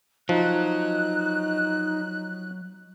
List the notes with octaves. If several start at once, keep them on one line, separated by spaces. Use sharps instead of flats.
F3 F#3 D#4 F#6